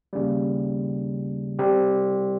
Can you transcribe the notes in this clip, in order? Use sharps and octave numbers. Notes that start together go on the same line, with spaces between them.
D#2 C#3 G3
C3 G3 C4 G4